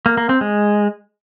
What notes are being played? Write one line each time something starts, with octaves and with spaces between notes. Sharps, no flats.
A#3
A#3
C4
G#3